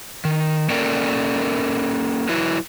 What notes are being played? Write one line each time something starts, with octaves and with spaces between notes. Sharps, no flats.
D#3
A#3 C#4 A4 A#4 D5 G5
F#3 E4 B4